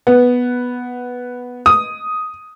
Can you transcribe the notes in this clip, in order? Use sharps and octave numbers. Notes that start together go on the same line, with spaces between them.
B3
D#6